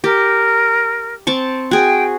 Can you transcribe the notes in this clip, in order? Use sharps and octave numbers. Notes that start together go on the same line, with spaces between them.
G4 A#4
C4 A5 C#6
F#4 G#4 G5